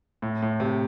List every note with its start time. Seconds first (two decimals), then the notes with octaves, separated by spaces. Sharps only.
0.22 A2
0.42 A2
0.60 C3